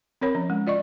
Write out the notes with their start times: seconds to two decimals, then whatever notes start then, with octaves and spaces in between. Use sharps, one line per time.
0.21 C4 A#4 C#5 B5
0.35 F3 C#4
0.50 G#3
0.67 F4 D5 D#5 C#6